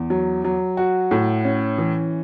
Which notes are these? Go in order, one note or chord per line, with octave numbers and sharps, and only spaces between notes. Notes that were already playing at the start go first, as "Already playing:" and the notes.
Already playing: E2
F#3
F#3
F#4
A2
C#4
E3